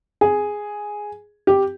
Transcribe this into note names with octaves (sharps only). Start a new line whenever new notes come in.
G#4
G4